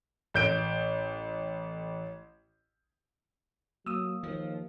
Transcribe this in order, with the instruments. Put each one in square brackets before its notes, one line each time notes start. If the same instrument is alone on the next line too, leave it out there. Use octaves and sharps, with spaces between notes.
[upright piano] A1 G6 D7
[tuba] F#3 [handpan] A#3 [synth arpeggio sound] D#6 E6
[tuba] D#2 [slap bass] F3